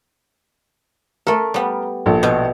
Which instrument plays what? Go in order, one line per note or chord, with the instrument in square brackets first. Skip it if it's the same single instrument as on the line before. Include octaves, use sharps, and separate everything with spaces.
[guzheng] A3 A4 [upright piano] A#4
[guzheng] G3 B3
[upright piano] A#1 A4
[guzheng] B2